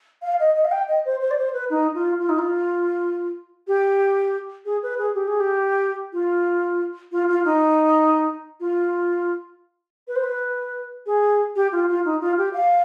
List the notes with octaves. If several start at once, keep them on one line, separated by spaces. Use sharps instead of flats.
F5
D#5
D#5
F5
G5
D#5
C5
C5
D5
C5
B4
D#4
F4
F4
D#4
F4
G4
G#4
B4
G#4
G4
G#4
G4
F4
F4
F4
D#4
F4
B4
C5
B4
G#4
G4
F4
F4
D#4
F4
G4
F5